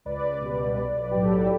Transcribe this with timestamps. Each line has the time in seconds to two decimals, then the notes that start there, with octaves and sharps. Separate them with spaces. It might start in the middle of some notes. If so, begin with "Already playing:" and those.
0.05 C#2 B4 D5
0.41 B2 G3
0.78 B1
1.11 A2 F#3 G4
1.24 A4
1.36 B4